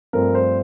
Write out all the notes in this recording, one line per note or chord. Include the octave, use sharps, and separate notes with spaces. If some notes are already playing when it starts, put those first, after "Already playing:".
G2 F3 A3 C4 A#4
C5